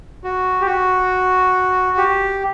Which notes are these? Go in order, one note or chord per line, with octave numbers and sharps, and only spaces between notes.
F#4
G4
F#4
G4